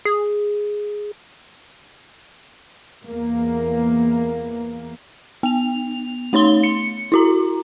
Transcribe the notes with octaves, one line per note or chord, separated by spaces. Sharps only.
G#4
E2 A#3
B3 F7
A3 D#4 C#5 C6 G7
C#7
E4 F#4 A#5